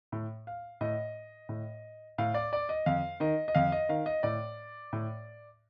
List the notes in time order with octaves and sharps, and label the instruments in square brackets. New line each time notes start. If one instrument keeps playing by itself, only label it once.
[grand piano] A2
F5
A2 D#5
A2
A2 F5
D5
D5
D#5
F2 F5
D#3 D#5
D#5
F2 F5
D#5
D#3 F5
D#5
A2 D5
A2